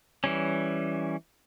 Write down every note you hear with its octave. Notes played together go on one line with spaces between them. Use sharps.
E3 G3 C#4